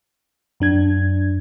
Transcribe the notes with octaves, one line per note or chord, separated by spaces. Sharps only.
F#2 D4 G#6